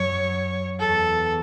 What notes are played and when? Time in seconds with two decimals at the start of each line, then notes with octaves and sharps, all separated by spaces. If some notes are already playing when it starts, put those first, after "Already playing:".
Already playing: F#2 C#5
0.80 E2 A4